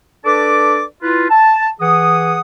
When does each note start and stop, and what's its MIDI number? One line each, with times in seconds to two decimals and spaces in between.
0.25 0.83 62
0.25 0.83 69
0.25 0.83 71
0.25 0.83 74
0.25 0.83 81
0.25 0.83 86
1.03 1.26 64
1.03 1.26 65
1.03 1.26 71
1.30 1.69 81
1.81 2.40 52
1.81 2.40 68
1.81 2.40 78
1.81 2.40 87